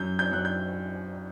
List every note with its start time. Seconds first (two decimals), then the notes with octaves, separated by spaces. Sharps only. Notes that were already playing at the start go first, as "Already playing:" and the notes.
Already playing: F#2 G6
0.19 G6
0.32 F#2 F#6
0.45 G6